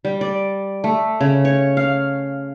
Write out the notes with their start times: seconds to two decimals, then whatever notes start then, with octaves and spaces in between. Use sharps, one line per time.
0.05 G3
0.21 D5
0.84 A3
1.21 C#3
1.45 C#5
1.77 F5